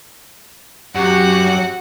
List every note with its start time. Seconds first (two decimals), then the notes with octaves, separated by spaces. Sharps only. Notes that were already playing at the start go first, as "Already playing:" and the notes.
0.95 F#2 F#4 G4 F#5